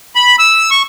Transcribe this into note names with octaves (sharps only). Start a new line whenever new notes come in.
B5
E6
C#6